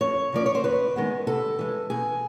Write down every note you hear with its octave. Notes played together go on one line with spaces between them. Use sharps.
F2 C#5
C#3 F3 A#3 D5
C#5
C5
D#2 B4
D#3 G#3 B3
C3 A4
E3 G#3
B2 G#4